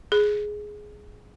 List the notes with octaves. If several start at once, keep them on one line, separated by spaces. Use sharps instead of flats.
G#4